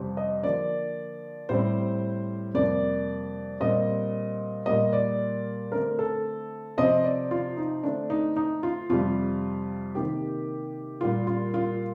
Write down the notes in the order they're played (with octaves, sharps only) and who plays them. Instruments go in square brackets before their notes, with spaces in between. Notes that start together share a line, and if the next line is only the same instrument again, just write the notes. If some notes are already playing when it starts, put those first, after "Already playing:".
Already playing: [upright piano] F2 C3 G3 C4
D#5
D3 F3 A#3 D5
A2 G3 C4 C5
F2 C3 G3 A#3 D5
A#2 G3 C4 D#5
A#2 G3 A#3 D#5
D5
D3 A3 C4 A#4
A4
C3 F3 C4 D#5
D5
F4
D#4
D3 A3 C4 D4
D#4
D#4
F4
F2 C3 G3 F4
C3 D#3 A#3 G4
A#2 G3 A#3 F4
F4
F4